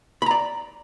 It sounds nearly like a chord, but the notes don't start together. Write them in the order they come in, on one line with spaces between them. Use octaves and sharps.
B5 A#5 D5